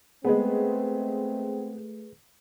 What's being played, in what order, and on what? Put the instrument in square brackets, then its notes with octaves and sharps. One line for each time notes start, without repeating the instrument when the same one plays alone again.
[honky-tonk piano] G#3 B3 [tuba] A3 [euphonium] C4 [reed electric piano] G#4 B4